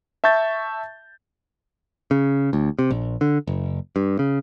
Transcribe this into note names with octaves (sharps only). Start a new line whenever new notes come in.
E5 A5 C#6 G6 A6
C#3
D2
C3
A#1
D3
F#1
G2
C#3